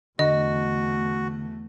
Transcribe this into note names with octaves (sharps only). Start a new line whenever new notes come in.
E2 D3 A3 F#4 D#5